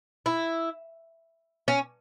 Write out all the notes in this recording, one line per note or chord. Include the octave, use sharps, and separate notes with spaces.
E4
C#4